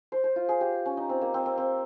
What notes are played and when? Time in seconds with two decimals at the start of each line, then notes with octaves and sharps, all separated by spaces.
0.12 C5
0.24 C5
0.36 F4
0.49 G#4
0.61 G4
0.86 C#4
0.97 D#4
1.09 C4
1.21 A#3
1.34 C4
1.46 C4
1.58 C4